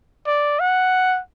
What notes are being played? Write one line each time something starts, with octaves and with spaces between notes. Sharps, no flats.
D5
F#5